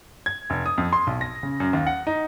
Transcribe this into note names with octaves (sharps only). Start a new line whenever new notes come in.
G#6
F1
D#6
F2
C6
B1
A#6
C#3
F#2
D#2
F#5
D#4